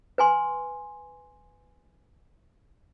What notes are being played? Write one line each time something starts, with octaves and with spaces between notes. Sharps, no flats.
B4 G#5 C6